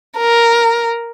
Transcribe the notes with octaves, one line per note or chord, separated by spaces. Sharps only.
A#4